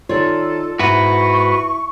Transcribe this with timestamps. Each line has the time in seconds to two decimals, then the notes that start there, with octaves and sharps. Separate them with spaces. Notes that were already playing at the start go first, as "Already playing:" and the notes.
0.09 D#3 F4 A4 C#5 D5
0.79 G#2 E4 F#4 B4 C#6